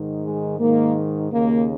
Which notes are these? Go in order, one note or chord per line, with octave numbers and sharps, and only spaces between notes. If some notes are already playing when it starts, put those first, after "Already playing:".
Already playing: G#2 D#3
G#3
G#2 D#3 A#3
D#2 C#3 A#3